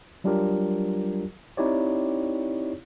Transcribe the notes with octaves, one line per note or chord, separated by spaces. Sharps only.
F#3 G3 D4 F4 G4 A#4
C4 D#4 E4 G4 C#5 D5